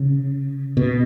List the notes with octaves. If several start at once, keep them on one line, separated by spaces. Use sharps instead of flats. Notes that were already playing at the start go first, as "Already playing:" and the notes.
Already playing: C#3
B2